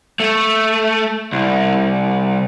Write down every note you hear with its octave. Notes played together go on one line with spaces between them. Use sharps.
A3
C2